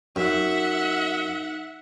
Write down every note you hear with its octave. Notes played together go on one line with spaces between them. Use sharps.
F#2 D#4 E5 F#5